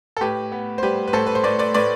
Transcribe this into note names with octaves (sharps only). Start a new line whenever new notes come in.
A4
A2 G4 B4
B3
C5
G3 G4 B4
B4
A2 A4 C5
B4
C5
A2 B4 D5
B4 D5
A2 B4 D5